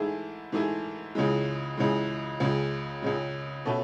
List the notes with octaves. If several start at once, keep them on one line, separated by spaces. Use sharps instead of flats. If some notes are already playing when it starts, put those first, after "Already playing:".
Already playing: G#2 E3 A3 E4 G#4
G#2 E3 A3 E4 G#4
C#2 C#3 E3 G#3
C#2 C#3 E3 G#3
C#2 C#3 G#3
C#2 C#3 G#3
B2 A3 C#4